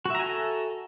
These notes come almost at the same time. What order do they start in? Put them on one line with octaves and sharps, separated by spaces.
F#4 E5 A#5 G#5 A4